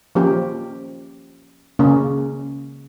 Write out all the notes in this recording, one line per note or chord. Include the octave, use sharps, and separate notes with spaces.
F3 A#3 C#4 G4
C#3 A#3 C#4